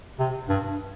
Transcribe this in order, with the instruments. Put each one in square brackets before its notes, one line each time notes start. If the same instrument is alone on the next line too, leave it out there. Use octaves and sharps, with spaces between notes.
[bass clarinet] C3
G2